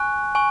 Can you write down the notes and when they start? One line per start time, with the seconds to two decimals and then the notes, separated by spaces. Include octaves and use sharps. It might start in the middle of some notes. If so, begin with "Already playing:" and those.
Already playing: G#5 C#6 F#6
0.35 G#5 C#6